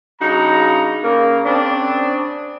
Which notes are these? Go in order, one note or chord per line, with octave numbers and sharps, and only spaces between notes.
G2 C#3 D#4 F#4 A#5
C#3 A#3
C#3 C4 D4